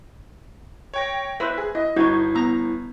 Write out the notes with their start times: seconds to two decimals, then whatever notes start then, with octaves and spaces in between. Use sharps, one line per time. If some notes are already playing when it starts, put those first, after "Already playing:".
0.94 C#5 G5 A#6
1.40 E4 B4 C5 E5
1.58 G#4
1.75 E4 D#5
1.96 G1 D#4 E4 F#4 G6 G#6
2.35 B3 A#5